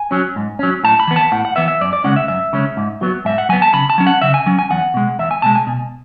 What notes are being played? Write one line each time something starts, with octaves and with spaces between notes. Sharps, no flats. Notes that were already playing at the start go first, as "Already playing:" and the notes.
Already playing: G#5
F#3 C#4
G#2
F#3 C#4
A2 A5
B5
E3 B3
A5
A2 F#5
F#5
E3 B3 E5
E5
F#2 D5
D5
C#3 G#3 C#4 F#5
E5
F#2 E5
C#3 G#3 C#4
G#2
F#3 B3
G#2 E5
F#5
F#3 B3 G#5
A5
C#3 B5
A5
F#3 C#4
F#5
C#3 E5
G#5
F#3 C#4
G#5
E2 F#5
B2 G#3
E2 E5
G#5
B2 G#3 A5
G#5
B2